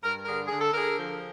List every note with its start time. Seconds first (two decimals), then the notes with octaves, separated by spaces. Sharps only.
0.03 G2 A#4
0.25 D3 G#4 A#4
0.48 D3 G#4
0.61 A4
0.73 D3 G#4 A#4
0.98 F3